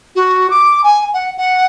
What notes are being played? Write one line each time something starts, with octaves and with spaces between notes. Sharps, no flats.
F#4
D6
G#5
F#5
F#5